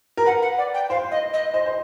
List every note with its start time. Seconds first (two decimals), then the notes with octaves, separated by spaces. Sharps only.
0.17 A#4
0.26 B4 F#5
0.42 F#5
0.58 D5
0.74 G5
0.90 C5 F5
1.11 D#5
1.33 D#5
1.53 C5 D#5
1.66 C5